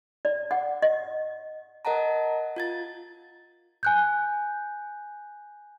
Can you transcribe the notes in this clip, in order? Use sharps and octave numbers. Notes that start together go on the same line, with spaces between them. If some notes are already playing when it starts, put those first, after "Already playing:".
D5
F#5
D#5
A#4 D#5 F#5 A5 A#5
F4 G#6 A6
G#5 F#6 G6